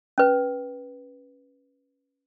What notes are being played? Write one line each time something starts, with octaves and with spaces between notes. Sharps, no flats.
C#4 B4